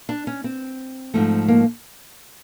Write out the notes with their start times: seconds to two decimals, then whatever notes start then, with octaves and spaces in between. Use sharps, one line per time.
0.09 D4
0.27 C#4
0.44 C4
1.14 G#2 F3 A3
1.48 A#3